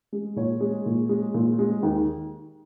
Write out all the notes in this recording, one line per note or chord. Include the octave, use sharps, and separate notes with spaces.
G#3
A#2 C#5
G#3
A#2
G#3
A#2
G#3
D#2